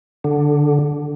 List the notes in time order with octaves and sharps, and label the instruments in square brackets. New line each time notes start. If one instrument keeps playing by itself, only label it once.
[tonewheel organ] D3